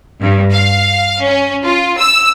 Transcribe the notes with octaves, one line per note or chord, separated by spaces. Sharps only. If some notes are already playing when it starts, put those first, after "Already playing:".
G2
F5
C#4
F4
E6